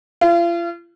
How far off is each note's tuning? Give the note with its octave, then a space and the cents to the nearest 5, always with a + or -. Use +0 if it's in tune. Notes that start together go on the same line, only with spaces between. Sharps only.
F4 -40